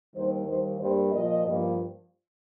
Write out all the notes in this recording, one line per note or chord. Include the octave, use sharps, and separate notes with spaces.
D#2 D#3 G3 C5
D#2 D#3 G3 A#3 C5
G2 G3 A#3 C5
A#2 F3 A#3 D#5
G2 F3 A#3